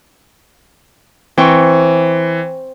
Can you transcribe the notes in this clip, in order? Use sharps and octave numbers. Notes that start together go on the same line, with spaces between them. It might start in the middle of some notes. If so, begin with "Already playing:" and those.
E3 C4 G5 C#6